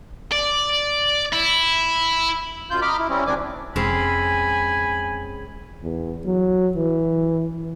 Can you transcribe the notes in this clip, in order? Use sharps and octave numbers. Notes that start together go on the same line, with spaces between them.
D5
E4
F#2 F4 G6
D#5 A#5 B5 D6 F6
E4
G3 C4 C#4 E4
D2 D#3 C4 D4 G#5 D6
F1 G#3 C4 C#4 G#5 B5
E2
F#3
E3